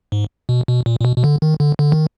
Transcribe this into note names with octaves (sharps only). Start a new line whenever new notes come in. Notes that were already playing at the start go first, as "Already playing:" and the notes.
G#2
B2
B2
A#2
A#2
B2
B2
D3
D#3
D3
D3
D#3